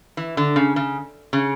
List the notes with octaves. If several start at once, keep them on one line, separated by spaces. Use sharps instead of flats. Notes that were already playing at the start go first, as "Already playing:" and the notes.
E3
D3
C#3
C#3
C#3